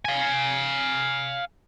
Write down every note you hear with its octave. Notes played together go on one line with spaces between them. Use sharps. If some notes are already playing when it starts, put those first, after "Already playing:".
F5 G#5